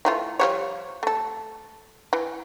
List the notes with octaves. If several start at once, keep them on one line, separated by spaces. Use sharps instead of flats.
E3 A3 F4
F3 G3 C#5
A3 A4
E3